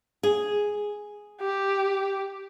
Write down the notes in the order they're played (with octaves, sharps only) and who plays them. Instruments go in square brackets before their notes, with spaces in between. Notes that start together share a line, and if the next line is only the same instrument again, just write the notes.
[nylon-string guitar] G#4
[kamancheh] G4